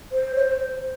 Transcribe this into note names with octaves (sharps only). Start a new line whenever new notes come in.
C5
C#5
C5